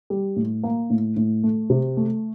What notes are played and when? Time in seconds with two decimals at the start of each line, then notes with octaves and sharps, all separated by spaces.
0.10 G3
0.36 A2
0.63 A#3
0.90 A2
1.17 A2
1.44 A3
1.70 C3
1.97 A3